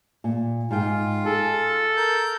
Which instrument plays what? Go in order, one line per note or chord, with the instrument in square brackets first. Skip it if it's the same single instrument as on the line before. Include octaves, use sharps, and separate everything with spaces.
[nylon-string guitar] A#2
[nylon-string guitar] G#2 G5 [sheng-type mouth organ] F4
[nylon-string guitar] G#4 [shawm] A4
[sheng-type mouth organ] A#4 G6